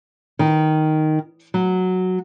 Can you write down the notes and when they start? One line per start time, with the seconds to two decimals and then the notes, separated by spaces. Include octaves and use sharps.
0.39 D#3
1.54 F#3